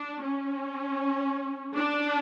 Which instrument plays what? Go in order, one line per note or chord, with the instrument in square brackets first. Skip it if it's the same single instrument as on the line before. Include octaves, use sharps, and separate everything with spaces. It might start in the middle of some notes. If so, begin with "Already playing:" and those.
Already playing: [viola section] D4
C#4
D4